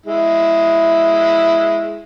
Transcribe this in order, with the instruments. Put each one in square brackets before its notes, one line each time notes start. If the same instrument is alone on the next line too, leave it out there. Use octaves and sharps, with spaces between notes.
[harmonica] G#3 E4